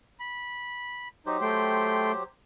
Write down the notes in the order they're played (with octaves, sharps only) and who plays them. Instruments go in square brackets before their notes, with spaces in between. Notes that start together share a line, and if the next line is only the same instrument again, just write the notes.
[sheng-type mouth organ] B5
[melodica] F#3 G4 C5 [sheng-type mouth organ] D#4
[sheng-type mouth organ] A3 G5 C6